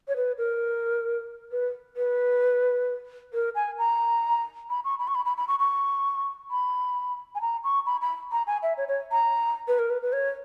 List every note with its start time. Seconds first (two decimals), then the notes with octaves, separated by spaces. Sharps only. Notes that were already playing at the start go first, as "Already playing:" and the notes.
0.08 C#5
0.16 B4
0.38 A#4
1.52 B4
1.97 B4
3.34 A#4
3.55 G#5
3.78 A#5
4.70 B5
4.84 C#6
4.99 B5
5.07 C#6
5.15 B5
5.25 B5
5.37 B5
5.48 C#6
5.59 C#6
6.51 B5
7.35 G#5
7.41 A#5
7.64 C#6
7.86 B5
8.01 B5
8.32 A#5
8.47 G#5
8.63 E5
8.77 C#5
8.88 C#5
9.11 A#5
9.68 B4
9.79 A#4
9.90 B4
10.02 B4
10.13 C#5